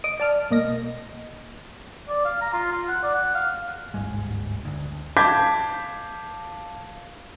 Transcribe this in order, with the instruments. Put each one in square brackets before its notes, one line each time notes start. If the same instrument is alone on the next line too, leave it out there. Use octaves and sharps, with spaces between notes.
[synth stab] D#5 D#6 D7
D5 A5 F6
B2 A#3 D#5 A#6
[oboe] D5
F5
A#5
F4
F4
F#5
D5
F#5
F5
[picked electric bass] D1 G1 G#2 G#3
D2
[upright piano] F5 A5 D6 G6 G#6 B6